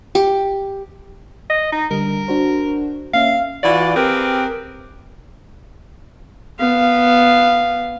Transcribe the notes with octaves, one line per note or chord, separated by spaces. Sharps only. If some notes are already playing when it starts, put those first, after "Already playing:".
G4
D#5
D#4
D3 G3 A#4
D4 F#4 C5
A#3 C#4 E5 F5
E3 F4 F#4 D5
C4 G4 G#4 A#4 B4
B3 F5